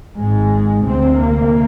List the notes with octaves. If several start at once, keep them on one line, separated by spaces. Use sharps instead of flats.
G#1 G#2 G#3
D2 C3 C4
A#3